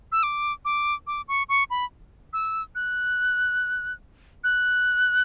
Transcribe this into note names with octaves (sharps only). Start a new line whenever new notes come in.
E6
D6
D6
D6
C#6
C#6
B5
E6
F#6
F#6